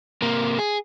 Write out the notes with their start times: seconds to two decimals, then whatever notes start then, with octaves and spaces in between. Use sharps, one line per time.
0.22 C3 A#3
0.59 G#4